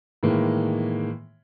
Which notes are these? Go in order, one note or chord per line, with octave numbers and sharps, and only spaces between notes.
A2 D#3 E3 G#3 A#3